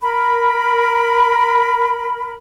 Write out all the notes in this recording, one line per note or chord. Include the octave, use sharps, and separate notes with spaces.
A#4 B5